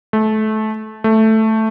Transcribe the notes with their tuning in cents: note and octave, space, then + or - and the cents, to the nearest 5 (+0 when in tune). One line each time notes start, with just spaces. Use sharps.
A3 -25
A3 +0